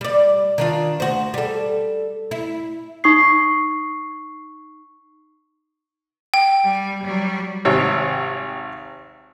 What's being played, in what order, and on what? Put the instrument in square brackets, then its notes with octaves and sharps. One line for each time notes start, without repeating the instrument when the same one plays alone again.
[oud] G3 D5
D#3 D4 F4
D2 F#4 C5
G3 A4
E4
[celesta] D#4 C#6 D#6 C7
[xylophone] G5
[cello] G3
F#3 G3
[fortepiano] G#1 C3 C#5